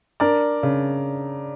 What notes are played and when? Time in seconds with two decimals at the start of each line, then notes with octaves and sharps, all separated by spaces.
0.20 D4 A#4 D5
0.63 C#3